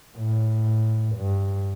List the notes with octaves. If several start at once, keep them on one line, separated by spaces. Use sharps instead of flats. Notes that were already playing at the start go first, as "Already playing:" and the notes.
A2
G2